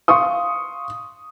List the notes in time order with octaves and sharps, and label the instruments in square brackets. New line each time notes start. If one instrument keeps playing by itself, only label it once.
[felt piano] F5 C6 C#6 D#6